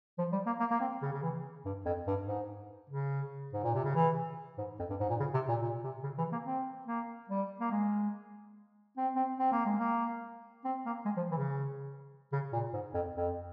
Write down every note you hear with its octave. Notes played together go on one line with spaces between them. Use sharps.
F3
G3
A#3
A#3
A#3
C4
C#3
C#3
E3
G2
F2
G2
G#2
C#3
G#2
A#2
C3
C#3
E3
G#2
F2
G2
G#2
A#2
C#3
C3
A#2
A#2
C3
C#3
E3
A#3
C4
A#3
G3
A#3
G#3
C4
C4
C4
A#3
G#3
A#3
C4
A#3
G#3
F3
E3
C#3
C#3
A#2
G#2
F2
F2